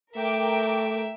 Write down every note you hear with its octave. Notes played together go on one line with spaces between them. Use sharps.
A3 A#4 E5 G5 D6